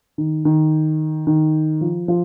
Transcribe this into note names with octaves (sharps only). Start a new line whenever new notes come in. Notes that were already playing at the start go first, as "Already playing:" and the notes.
D#3
D#3
D#3
F3
F3